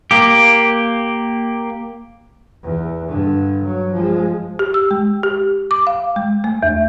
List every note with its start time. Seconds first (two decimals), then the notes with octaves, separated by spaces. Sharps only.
0.11 A#3 G4
2.63 E2
3.08 G2 D3
3.63 F#3
3.92 F3 G#3
4.59 G4
4.74 E6
4.91 G#3
5.23 G4
5.71 D6
5.87 F5
6.16 G#3
6.44 A3
6.63 E2